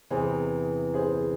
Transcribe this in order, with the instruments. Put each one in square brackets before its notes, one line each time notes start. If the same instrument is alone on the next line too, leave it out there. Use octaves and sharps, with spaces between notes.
[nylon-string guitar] E2 C3 E3 [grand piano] G#4 C5
[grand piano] G#4 C5